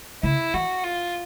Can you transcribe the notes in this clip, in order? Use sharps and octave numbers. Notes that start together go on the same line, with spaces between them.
C#3 E4
E3 F#4
F4